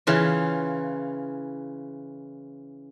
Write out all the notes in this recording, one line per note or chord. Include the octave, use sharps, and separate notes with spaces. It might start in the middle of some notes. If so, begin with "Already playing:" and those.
C#3 E3 F4